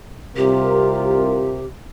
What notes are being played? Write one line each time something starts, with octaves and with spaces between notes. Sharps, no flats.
C2 C3 F4 G4 A#4